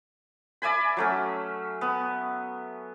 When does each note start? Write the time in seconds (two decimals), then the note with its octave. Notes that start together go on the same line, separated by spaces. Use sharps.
0.62 D5 E5 G#5 B5
0.97 F#3 A3 C#4
1.81 B3